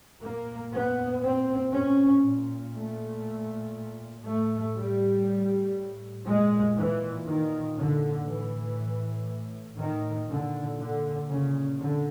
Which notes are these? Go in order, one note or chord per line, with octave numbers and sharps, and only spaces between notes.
A#2 A#3
B3
C4
C#4
A#2
A3
A2 A3
G3
A#2 G#3
E3
D#3
D3
A2 E3
D#3
A#2 D3
D3
C#3
D3